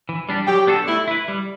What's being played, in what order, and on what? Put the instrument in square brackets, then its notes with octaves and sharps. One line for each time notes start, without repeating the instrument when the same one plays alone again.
[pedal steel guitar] E3
G3 D4 G4
[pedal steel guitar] F#3 [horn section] G4
[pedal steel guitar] B3 D4 F#4 A4
[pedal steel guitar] A3 [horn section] E4
[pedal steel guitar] E4 B4
G3